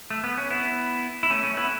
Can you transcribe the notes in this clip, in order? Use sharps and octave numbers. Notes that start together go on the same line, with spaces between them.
A3
B3
C#4
B3 E4
E4
A3 C#4
A3 C#4
B3 E4